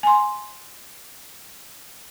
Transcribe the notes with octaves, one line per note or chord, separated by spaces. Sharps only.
G#5 C6